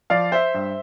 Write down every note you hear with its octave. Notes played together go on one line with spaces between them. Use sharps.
F3 D5 F5
C5 E5
G2